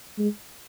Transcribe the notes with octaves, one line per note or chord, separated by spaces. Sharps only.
G#3